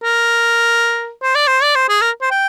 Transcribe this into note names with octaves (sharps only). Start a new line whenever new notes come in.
A#4
C5
D5
C5
D5
C5
G#4
A#4
C5
G5